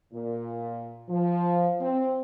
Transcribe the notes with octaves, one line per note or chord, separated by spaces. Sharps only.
A#2
F3
C4